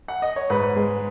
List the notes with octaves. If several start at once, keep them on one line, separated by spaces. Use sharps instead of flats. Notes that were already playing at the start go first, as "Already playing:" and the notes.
F#5
D#5
C#5
G#2 B4
G#3